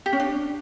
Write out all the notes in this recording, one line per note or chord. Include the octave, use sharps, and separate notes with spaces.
G4
C#4
D4